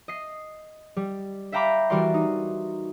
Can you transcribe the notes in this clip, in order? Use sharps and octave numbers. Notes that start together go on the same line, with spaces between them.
D#5 C7
G3
E5 F5 G5 A#5 B5 D6
E3 G3 F#4 A#4 D5 C6
D#4